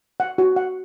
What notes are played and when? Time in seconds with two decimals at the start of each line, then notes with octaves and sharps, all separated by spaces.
0.20 F#5
0.38 F#4
0.56 F#5